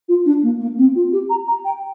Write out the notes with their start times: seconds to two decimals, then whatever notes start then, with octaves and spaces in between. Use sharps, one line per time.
0.09 F4
0.26 D4
0.43 A#3
0.60 A#3
0.78 C4
0.95 F4
1.13 G4
1.30 A#5
1.48 A#5
1.65 G5